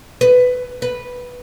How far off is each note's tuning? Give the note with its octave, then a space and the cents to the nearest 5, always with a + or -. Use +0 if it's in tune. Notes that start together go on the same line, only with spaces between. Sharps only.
B4 +15
B4 -5